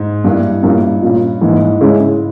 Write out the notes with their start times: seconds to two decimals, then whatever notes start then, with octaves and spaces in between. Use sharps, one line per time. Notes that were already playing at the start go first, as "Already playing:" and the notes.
Already playing: G#2
0.24 G2 G3 A#3 E4
0.63 G2 A#2 A#3 C#4 E4
1.02 A#2 A#3 C#4
1.41 G#2 E3 A#3 E4
1.80 C#3 G#3 C#4 E4